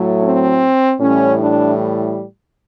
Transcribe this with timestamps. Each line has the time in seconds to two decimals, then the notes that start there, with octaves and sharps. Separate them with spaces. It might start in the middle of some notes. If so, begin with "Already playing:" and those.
Already playing: A2 F#3 A3
0.24 C4
0.99 A2 E3 G3 C#4
1.39 D4